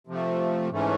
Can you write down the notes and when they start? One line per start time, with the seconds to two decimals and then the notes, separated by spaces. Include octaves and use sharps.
0.07 C3 F3 A3
0.70 G#2 E3 A3 C#4